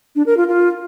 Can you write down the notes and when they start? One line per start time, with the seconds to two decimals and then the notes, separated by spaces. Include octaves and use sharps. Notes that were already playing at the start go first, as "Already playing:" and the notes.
0.16 D4
0.26 A#4
0.37 F4
0.48 F4